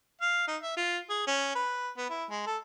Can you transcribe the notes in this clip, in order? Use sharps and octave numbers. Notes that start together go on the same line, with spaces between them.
F5
D#4
E5
F4
G#4
C#4
B4
B3
E4
G#3
A4